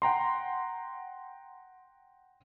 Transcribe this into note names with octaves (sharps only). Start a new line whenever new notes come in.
F#5 G5 A#5 C6